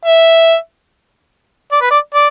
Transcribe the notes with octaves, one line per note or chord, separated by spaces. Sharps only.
E5
D5
B4
D5
D5